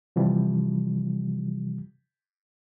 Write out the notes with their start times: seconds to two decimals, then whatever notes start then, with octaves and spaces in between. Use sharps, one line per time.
0.16 C3 E3 F3 G3